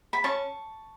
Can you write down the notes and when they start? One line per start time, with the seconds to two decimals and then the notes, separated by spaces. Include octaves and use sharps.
0.13 B5
0.24 C#4 A5 C#6